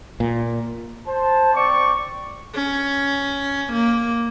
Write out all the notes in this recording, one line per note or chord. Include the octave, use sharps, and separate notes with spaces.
A#2
C5 A5
C4 D5 C#6 D6
C#4
A#3